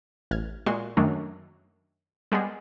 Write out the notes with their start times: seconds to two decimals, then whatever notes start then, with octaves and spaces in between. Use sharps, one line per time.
0.31 A1 F6 G#6
0.66 A#2 G#3 F#4 C6
0.97 F#2 D#3 F#3 A3 D4
2.32 G3 G#3 B3 G#4